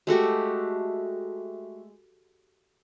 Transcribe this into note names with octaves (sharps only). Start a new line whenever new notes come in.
G#3 A3 F#4 G4